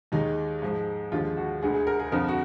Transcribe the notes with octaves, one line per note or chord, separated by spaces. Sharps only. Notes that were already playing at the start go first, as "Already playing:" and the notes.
D#2 D#3 G#3 D#4
G#2 F3 G#3
D#2 D3 F3 G#3 F4
F#4
D2 D3 G#3 G#4
G#4
A#4
G#4
F2 D3 F3 A#4
F#4